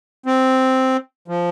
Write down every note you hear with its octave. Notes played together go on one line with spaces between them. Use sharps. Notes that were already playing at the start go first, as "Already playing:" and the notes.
C4
F3